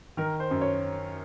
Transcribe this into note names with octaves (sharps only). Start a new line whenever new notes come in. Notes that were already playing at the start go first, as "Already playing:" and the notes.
D#3 A#4
C5
F#2
C#5